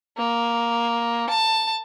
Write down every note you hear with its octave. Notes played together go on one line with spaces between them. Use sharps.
A#3
A5